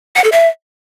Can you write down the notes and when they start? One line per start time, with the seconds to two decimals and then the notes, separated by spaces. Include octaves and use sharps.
0.16 F#5
0.24 A4
0.32 E5